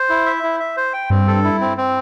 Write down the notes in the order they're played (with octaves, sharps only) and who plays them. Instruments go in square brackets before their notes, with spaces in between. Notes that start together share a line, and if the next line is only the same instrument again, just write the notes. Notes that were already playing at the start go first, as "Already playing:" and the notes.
Already playing: [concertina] C5
E4
E5
E4
E5
C5
G5
[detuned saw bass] G2 [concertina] C4
[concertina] A4
E4
C4
C4